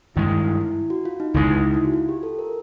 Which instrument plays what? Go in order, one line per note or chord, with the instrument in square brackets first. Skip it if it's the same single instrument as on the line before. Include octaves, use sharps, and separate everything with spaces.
[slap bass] G2 D#3 G#3 [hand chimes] E4
[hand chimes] E4
E4
F#4
F4
D#4
[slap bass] C#2 C#3 E3 G#3 [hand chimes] E4
[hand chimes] D#4
E4
F#4
F4
G4
A4
A#4